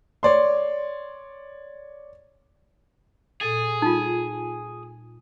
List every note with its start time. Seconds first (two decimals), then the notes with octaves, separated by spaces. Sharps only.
0.23 C#5 D5 C6
3.41 A#2 G#4 A4 A6
3.82 G3 D#4 F4